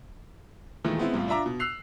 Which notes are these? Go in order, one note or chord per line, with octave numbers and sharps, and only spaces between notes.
A#2 D#3 E3 G#3 A3
G#3 B3 C4 E4
C2 A2 F4
D4 F4 E5 A#5 D6
B2
E6 F#6 C7 F7